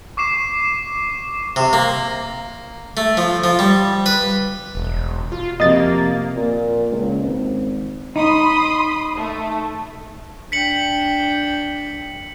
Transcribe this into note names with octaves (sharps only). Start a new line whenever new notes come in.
C#6 D6 C7 E7
C3
A#3
A3
F3
F3
G3
B4
E1
F4
F2 C3 A#3 D#5 A6
A#2
C#2
G#1
D#4 B5 C6 D#6
A3
D4 G5 B6 C#7 F#7